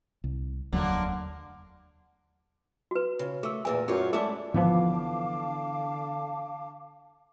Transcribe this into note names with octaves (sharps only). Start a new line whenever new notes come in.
C2
F1 D#2 D3 F#3 A#3
F#4 B4
C#3
A3 G#4 A#4
E2 A#2 A#3 G#4 A#4 G#5
F#2 F4 G#4 C#5
G#3 A3 D4 E4 G#4 A4 E5 D6
G#1 D3 E3 F3 B3 F5 A5 D6